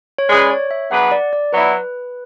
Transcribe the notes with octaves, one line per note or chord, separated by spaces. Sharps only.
C#5
G#3 C#4 G#4 B4 D5
C#5
E5
F#3 B3 D4 G#4 B4 F#5
D5
D5
F#3 B3 E4 B4